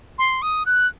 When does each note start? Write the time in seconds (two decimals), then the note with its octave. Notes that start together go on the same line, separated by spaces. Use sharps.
0.18 C6
0.42 D#6
0.66 F#6